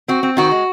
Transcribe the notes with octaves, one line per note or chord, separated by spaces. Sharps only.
C4 F#4
C4
D#3 F#4
G#3